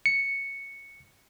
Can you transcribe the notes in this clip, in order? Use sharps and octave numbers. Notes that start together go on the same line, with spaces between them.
C#7